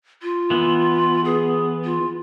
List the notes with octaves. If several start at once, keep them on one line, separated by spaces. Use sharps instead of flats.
F4
E3 B3
G#4
F4